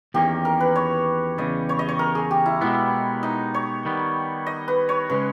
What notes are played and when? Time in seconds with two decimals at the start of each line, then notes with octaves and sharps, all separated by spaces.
0.14 E2 D#3 A#3 C#4 G4
0.45 A#4
0.60 B4
0.75 C#5
1.38 E2 C#3 G3 D#5
1.69 C#5
1.79 D#5
1.89 C#5
1.99 A#4
2.15 G#4
2.31 G4
2.46 E4
2.61 B2 G#3 B3 E4
3.23 D#4
3.54 C#5
3.85 D#3 G3 B3
4.47 D#5
4.68 B4
4.89 C#5
5.10 C#3 G#3 C#4 B4